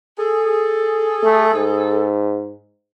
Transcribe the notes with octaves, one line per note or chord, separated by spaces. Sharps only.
G#4 A4
A3
G#2